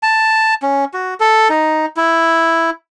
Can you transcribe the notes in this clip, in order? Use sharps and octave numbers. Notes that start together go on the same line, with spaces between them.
A5
C#4
F#4
A4
D#4
E4